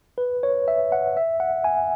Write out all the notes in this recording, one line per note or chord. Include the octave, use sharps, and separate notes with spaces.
B4
C#5
E5
F#5
E5
F#5
G#5